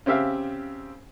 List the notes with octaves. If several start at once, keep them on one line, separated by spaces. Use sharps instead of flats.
C#3 C4 G4 E5 F5